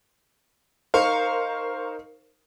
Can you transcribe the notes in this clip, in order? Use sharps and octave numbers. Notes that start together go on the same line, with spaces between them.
D#4 A#4 C5 F5 C#6